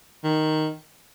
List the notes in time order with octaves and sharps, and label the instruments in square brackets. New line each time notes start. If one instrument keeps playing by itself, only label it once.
[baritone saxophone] D#3